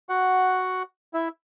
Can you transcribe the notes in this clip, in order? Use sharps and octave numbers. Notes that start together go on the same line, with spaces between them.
F#4 F#5
E4 E5